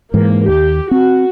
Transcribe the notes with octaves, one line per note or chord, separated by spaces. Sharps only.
G#2 E3 A#3
D#2 G4
C4 F#4